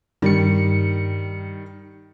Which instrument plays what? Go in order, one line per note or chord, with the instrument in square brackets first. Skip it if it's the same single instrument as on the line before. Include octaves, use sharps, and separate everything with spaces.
[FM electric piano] G2 C#7 [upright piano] D#3 G3